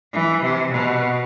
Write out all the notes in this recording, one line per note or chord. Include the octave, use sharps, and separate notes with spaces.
E3
C3
B2